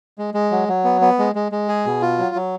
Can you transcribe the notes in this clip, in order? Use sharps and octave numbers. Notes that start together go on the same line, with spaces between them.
G#3
G#3
F#3
F#3
B3
B3
G#3
G#3
G#3
G#4
B2
F4
F#3
F#3